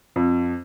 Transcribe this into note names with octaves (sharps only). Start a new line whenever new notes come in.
F2